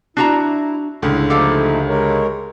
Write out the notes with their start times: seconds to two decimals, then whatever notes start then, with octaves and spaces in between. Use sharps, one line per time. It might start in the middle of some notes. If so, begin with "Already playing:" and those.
0.17 D4 E4 F#4 A#5
1.02 C#2 A2 D3
1.30 F3 A3 D#4 G4 A4 F5
1.89 G#3 A#4 C#5